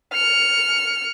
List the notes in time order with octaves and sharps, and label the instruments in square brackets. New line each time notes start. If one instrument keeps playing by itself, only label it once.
[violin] F6 C#7